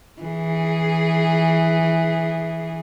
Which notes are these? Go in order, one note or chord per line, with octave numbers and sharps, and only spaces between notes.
E3 G#4